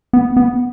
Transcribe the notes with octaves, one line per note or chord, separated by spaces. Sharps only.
B3
B3